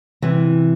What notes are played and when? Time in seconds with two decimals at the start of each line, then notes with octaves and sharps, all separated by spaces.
0.22 C3 E3